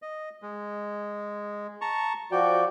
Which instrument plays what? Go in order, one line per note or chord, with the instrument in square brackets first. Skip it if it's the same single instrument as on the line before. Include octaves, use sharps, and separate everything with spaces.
[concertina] D#5
G#3
A5 A#5 C#6
[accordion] F3 F#4 D5 [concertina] G5